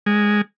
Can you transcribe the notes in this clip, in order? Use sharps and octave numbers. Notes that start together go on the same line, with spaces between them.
G#3